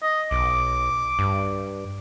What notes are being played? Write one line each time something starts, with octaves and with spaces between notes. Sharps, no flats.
D#5
B1 D6
G2